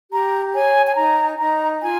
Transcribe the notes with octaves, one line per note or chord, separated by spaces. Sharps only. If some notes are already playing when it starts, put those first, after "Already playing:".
G4 A#5
C#5 G#5
G#5
D#4 A#5
D#4 A#5
F4 G#5